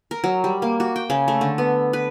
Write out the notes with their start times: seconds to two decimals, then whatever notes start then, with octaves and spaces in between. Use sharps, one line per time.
0.11 A#4
0.24 F#3
0.44 G3
0.62 A#3
0.80 F#4
0.96 G5
1.10 C#3
1.28 A3
1.41 D3
1.58 B3
1.93 B4